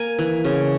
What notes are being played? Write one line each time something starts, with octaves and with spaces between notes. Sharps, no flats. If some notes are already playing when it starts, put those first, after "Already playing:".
Already playing: A#3 G#5
E3
C#3